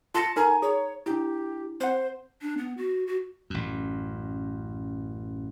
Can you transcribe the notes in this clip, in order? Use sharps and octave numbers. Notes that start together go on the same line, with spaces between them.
F4 A5 C6 A#6 C#7
D#4 A4 A#4 G#5 A#5
G#4 C#5
D4 E4 G4
C4 C5 F#5
D4
B3
F#4
F#4
A1 F#2